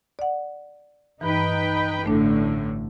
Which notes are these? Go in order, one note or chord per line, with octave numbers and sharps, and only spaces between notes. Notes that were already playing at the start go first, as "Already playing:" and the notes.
D5 F#5
G2 E3 D#4 B4 G5
A1 A2 D3 A3 D4